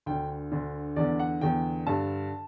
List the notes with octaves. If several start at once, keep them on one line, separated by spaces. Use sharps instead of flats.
D2 D3 G5
D2 D3
E2 D3 D5
F#5
E2 D3 G5
G2 D3 A5